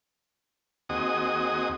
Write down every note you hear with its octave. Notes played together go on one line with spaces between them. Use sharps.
D#2 C4 F#4 G#4 D#5 D#6